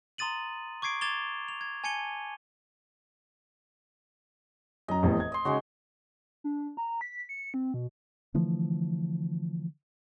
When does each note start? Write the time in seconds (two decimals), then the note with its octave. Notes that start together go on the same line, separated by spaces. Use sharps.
0.18 A#5 C6 D#6 A6 D#7 F#7
0.82 C#6 D6 G#6 C7 D7
1.01 D6 G#6 A6 E7 F7 G7
1.48 F7
1.61 G#6
1.84 G#5 A5 G#6 C#7 D#7 G7
4.88 F#2 F#3 D#5 A#5
5.03 F1 E2 A2
5.20 G#6
5.32 D#5 C6
5.45 C#3 G#3 D#4 F#4
6.44 D4
6.77 A#5
7.01 B6
7.29 C#7
7.54 C4
7.74 B2
8.34 D3 E3 F3 A3